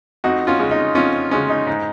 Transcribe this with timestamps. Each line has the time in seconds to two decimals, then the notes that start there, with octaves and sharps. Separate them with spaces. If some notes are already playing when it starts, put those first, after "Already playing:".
0.24 F2 D#4 F#4
0.47 C#4 F4
0.59 C#3 G#3
0.71 D#4
0.95 F2 C#4 F4
1.31 C#3 G#3 C#4
1.50 D#4
1.67 G#2